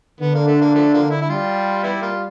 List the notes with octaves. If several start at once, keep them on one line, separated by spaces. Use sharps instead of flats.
D3 B3
A#3
A3
A#3
F3 A3
F3 A#3
E4
E4
G3 F4
B3 E4
A#3 F4